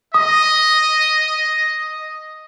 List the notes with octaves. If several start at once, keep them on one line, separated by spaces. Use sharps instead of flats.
D#5 D#6